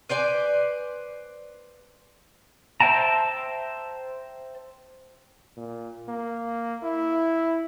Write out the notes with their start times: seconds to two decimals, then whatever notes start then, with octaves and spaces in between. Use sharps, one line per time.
0.09 B4 C5 D5 G#5
2.80 C5 E5 G5 A5 A#5
5.57 A#2
6.09 A#3
6.83 E4